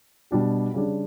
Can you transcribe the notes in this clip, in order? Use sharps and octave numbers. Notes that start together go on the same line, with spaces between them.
B2 G3 D4 G4
C#3 G3 D4